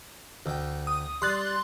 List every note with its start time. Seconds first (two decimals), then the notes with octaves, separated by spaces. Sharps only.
0.46 D2 G5
0.87 D#6
1.22 G3 C6 F#6 A6